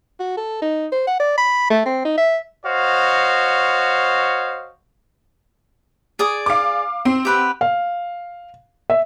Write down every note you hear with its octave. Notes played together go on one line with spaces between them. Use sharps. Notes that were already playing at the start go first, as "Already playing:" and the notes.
F#4
A4
D#4
C5
F#5
D5
B5
A3
C4
D#4
E5
F#4 C5 C#5 D#5 F5
G#4 D5 D#6
F5 D6
C4 C6
G4 B4 F#5
F5
E5